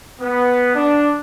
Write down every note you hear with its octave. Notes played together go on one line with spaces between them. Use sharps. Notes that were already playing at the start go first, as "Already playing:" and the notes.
B3
D4